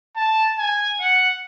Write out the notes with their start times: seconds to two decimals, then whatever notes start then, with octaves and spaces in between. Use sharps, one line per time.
0.16 A5
0.58 G#5
1.00 F#5